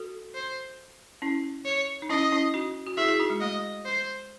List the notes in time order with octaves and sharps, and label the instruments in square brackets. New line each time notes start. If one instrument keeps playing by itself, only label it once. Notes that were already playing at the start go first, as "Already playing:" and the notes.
Already playing: [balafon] F#4 A4
[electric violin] C5
[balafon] C#4 E4
[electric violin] C#5
[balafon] D#4
[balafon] C#4 E4 [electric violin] D#5
[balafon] C#4 E4
D#4 F#4
F#4
[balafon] E4 G#4 [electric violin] E5
[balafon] F#4
E4 G#4
D#4 F#4
G#3
[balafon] A3 [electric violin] D#5
[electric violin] C5